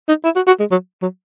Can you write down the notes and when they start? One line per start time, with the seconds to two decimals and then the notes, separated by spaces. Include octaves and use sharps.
0.09 D#4
0.24 E4
0.36 F#4
0.47 F#4
0.59 G#3
0.71 F#3
1.02 F#3